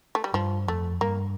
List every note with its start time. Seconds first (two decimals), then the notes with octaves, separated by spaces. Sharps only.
0.15 A3
0.24 G3
0.34 G2 F3
0.67 F2 A3
1.01 G2 A#3